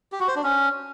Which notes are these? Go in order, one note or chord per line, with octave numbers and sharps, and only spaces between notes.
G4
F#4
C5
D4
C#4